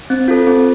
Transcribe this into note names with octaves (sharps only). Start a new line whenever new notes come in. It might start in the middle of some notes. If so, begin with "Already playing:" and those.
C4
F4 A4
C4